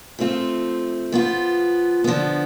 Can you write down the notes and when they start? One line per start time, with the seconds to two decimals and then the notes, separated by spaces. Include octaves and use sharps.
0.19 F3 A3 C4 F4
1.12 F3 B3 F4
2.04 D3 F3 B3